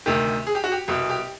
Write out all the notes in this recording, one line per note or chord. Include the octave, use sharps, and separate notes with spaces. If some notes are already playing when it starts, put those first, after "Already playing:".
D2 C3 D#3 G4
G#4
G4
F#4
G4
C2 B2 G4
G4